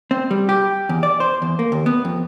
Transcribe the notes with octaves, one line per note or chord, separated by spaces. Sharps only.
C4
G3
G4
E2
D5
C5
E2
A#3
D#2
B3
F2